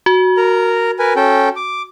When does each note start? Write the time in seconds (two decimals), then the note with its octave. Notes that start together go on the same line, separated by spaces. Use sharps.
0.06 F#4
0.37 A#4 A#5
0.99 A#4 B4 G#5
1.16 C#4 A4 G5
1.56 D6